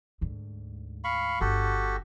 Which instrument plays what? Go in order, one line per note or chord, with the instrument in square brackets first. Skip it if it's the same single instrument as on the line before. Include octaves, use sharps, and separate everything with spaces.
[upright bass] D2 G#2
[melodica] F5 B5 C#6
[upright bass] G1 [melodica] F#4 G4 A4